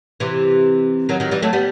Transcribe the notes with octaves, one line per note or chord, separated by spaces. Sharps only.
C3 E3
D#3 F#3
D#3 F#3
E3 G3
F#3 A3
G3 B3